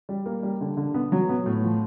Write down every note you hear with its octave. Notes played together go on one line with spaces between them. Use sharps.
G3
A#3
G3
D3
D3
B3
F#3
B3
A2
F3